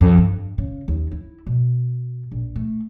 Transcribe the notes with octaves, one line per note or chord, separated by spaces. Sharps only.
F2
G2
C#3
D#2
E4
B2
A#1
A3